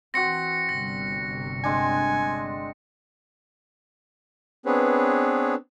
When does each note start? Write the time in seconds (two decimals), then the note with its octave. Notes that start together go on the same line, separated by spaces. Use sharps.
0.14 E3 C4 F#4 A#6 C#7
0.69 G1 C3 G3 A#6
1.64 G#3 C4 D4 G#5
4.66 B3 C4 D4 G#4 B4 C#5